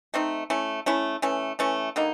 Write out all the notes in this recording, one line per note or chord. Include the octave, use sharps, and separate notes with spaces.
A3 C4 D#4
A3 C#4 E4
A3 C#4 E4
E3 A3 C#4
E3 A3 C#4
D3 G3 A#3 D#4